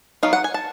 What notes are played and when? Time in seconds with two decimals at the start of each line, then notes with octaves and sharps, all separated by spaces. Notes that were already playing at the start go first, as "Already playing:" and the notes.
0.23 F#3 B3 D#4 F5
0.33 F#5
0.44 G#5
0.54 A5